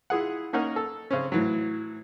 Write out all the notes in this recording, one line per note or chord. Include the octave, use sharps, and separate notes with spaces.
E4 F4 G#4 F#5
A#3 C#4 D#4 A#4 F#5
A4
C#3 C4 C#4
A2 E3 F#3